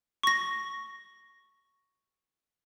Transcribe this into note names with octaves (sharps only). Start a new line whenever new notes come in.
C#6 A#6